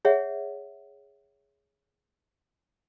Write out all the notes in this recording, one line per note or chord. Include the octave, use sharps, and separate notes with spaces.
G#4 C#5 E5 F#5